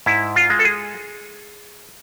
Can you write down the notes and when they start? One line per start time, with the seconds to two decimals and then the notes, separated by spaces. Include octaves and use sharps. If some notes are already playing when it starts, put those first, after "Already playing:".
0.06 G#2 E4
0.36 F4
0.50 G#3
0.59 A4
0.65 G#4